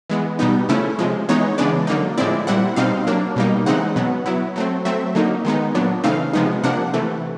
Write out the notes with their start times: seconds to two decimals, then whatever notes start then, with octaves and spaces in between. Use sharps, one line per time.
0.09 E3 G#3 B3
0.39 B2 G3 B3 D#4
0.69 C#3 F3 A3 C#4 E4
0.99 C3 F3 G#3
1.29 E3 G#3 B3 D#4 C#5
1.58 C#3 E3 G#3 B3 D4 D5
1.87 D3 F#3 A#3 D#4
2.17 A2 F3 G#3 C4 E4 D5
2.47 A#2 G3 C4 E4 F#5
2.76 B2 G3 C4 D#4 F5
3.07 F#3 A#3 D4
3.36 B2 G3 A#3 D#4
3.66 C#3 E3 G#3 C4 D#4 F#5
3.96 B2 F#3 B3
4.26 F#3 B3 E4
4.56 F#3 A3 C4
4.85 F#3 A3 C4 E5
5.15 D3 F#3 A#3 D#4
5.45 D#3 G#3 B3 D#4
5.75 A#2 F#3 B3 D4
6.04 C#3 E3 A3 C4 D#4 F5
6.33 C3 F3 G#3 B3 D#4
6.64 C3 F3 A#3 D4 F#5
6.94 C3 E3 A3